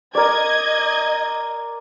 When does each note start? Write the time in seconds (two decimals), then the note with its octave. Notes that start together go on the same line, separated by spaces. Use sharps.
0.15 A#4 D5 D#5 G#6